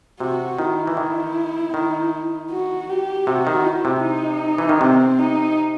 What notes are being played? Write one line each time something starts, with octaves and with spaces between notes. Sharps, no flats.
C3 F#4
D#3 E4
E3
D#3
D#3
F#4
G4
C3 F#4
D#3
E4
C3
D#4
E3
D#3
C3 C4
D#4